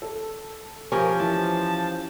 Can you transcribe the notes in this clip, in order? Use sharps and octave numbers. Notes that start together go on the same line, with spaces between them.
A4
F3 C#4 G4 A#4
E3 A5